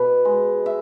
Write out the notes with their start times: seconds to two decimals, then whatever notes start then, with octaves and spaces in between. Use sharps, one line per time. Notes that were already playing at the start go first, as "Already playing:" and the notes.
Already playing: B2 B4
0.25 G#3
0.66 E5